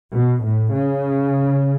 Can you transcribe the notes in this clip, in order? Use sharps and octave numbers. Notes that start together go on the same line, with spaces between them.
B2
A2
C#3